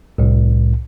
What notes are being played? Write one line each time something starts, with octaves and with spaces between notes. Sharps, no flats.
C2 A2